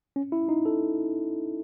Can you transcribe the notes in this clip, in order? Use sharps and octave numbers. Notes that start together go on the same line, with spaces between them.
C#4
E4
D#4
A4